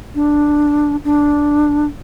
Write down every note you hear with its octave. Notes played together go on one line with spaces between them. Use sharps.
D4
D4